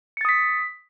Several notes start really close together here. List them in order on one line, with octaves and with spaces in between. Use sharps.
C#7 A6 D#6 B6